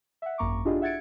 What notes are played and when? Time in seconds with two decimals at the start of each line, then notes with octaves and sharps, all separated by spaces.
0.22 E5 F#5
0.38 G#1 F#2 A#3 A#5 C#6 D6
0.65 D4 E4 F4 G4 G#4 D#5
0.82 E5 F#5 G#6 A6 C#7 D7